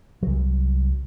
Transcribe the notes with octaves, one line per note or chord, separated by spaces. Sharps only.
C2 F#3